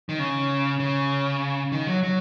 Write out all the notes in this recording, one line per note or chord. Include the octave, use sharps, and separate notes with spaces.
D#3
C#3
C#3
D#3
F#3
F#3